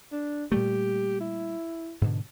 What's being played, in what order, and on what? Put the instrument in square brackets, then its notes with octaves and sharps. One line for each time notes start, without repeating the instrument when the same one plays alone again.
[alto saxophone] D4
[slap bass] A#2 G3 A3 [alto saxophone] G4
[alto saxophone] E4
[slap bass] G#2 B2 D3